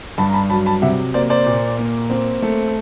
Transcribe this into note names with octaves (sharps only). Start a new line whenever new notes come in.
G2 A5 B5
A#5
A5 B5
F#3 A5 B5
A5 B5
C3 E5 F#5
A#3 C5 D5
C5 D5
A#2
A#3
C4
A3